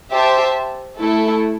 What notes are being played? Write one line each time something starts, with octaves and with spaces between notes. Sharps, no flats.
G4 C5 E5 A5
A3 E4 A4